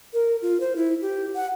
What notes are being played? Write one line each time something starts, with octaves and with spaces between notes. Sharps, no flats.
A#4
F4
C5
E4
G4
F#5